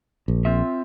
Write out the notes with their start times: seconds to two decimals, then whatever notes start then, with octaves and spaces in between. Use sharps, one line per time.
0.28 A#1
0.45 C4 F4 E5